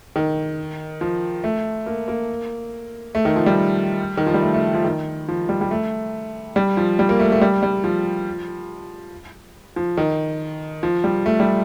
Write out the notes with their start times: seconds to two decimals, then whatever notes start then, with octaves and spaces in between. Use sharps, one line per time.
0.16 D#3
1.01 F3
1.44 A3
1.86 A#3
2.08 A#3
3.15 A3
3.25 D#3
3.36 F3
3.46 G3
4.17 D#3
4.26 F3
4.34 G3
4.42 A3
4.54 A3
4.74 F3
4.85 D#3
5.28 F3
5.49 G3
5.61 G3
5.71 A3
6.56 G3
6.77 F3
6.99 G3
7.09 A#3
7.20 A3
7.32 A3
7.41 G3
7.63 G3
7.84 F3
9.76 F3
9.97 D#3
10.83 F3
11.04 G3
11.26 A3
11.40 G3